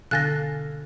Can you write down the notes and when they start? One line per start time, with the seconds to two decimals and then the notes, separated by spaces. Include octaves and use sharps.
0.11 B2 D3 A4 F5 G#5 F#6 A6 A#6